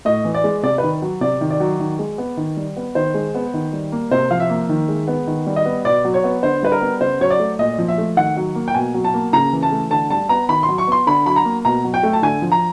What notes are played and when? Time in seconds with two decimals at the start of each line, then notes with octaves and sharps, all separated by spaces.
0.05 A2 D#5
0.25 E3
0.34 D5
0.44 G#3
0.63 C3 D5
0.78 D#3 B4
1.02 F#3
1.21 C3 D5
1.41 D#3
1.50 D5
1.60 F#3
1.80 D#3
1.99 G#3
2.18 B3
2.37 D#3
2.57 G3
2.77 B3
2.95 D#3 C5
3.14 G#3
3.35 B3
3.54 D#3
3.73 G3
3.92 A#3
4.11 C3 C5
4.31 F3 F5
4.40 E5
4.50 A#3
4.69 D#3
4.89 G#3
5.08 B3
5.27 D#3
5.46 G3
5.56 D#5
5.66 B3
5.85 B2 D5
6.05 F#3
6.14 C#5
6.24 B3
6.43 D3 C5
6.63 G3 B4
6.72 A#4
6.81 B3
7.01 C#3 C5
7.21 F#3 C#5
7.31 D5
7.40 A3
7.59 A#2 D#5
7.79 F3
7.88 E5
7.98 A3
8.16 D#3 F#5
8.37 F#3
8.55 A#3
8.68 G5
8.75 B2 G#5
8.94 F#3
9.04 A5
9.14 A#3
9.33 C#3 A#5
9.53 E3
9.63 A5
9.72 A3
9.90 D3 A5
10.10 G3 A5
10.29 B3 A#5
10.49 D#3 B5
10.63 C6
10.69 F#3
10.78 C#6
10.87 B3 C6
11.07 D3 B5
11.26 F#3 B5
11.36 A#5
11.45 A#3
11.65 B2 A#5
11.84 F#3
11.94 G5
12.03 A3
12.13 A5
12.22 D3 G#5
12.42 F3
12.52 A#5